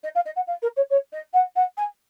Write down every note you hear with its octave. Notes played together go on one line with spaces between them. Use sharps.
D#5
F5
D#5
F#5
F5
A#4
C#5
C#5
D#5
F#5
F#5
G#5